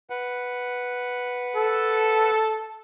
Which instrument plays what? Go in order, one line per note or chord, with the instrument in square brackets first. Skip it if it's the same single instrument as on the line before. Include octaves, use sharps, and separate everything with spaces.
[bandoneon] B4 F#5
[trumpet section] A4